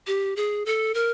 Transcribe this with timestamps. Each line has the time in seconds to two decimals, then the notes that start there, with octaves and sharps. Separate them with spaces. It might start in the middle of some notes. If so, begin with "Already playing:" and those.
0.07 G4
0.36 G#4
0.66 A4
0.94 A#4